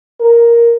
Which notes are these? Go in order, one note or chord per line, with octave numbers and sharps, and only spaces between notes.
A#4